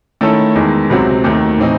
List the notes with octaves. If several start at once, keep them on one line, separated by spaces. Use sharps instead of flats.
D#3 A3 C#4 E4 A4
E2 D#3 G#3
C#2 C3 F#3 C4 F#4
D#2 D#3 A3
A2 E3 C4 D#4